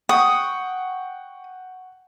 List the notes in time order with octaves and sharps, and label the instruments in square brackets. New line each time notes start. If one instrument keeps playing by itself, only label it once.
[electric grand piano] F#5 G5 C#6 [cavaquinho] D#6